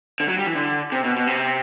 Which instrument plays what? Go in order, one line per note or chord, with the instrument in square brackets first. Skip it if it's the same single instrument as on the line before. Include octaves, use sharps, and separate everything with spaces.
[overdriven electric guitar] D3
F#3
G3
E3
D3
C3
B2
B2
C3